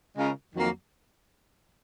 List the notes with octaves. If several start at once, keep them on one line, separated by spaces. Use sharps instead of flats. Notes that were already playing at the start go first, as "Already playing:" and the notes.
C#3 G#3 C#4 F4 A#4
F2 D#3 F#3 A#3